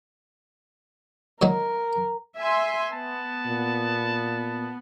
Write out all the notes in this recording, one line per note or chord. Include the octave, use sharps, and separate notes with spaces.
A#2 F#3 D#4 A#4
E5 G#5 C6
B3 A5
A#2